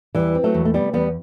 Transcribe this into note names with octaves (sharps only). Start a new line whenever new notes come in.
E2 E3 G3
C4
F#3 A3
E2
A3
C3 G3 B3
E2 G3 B3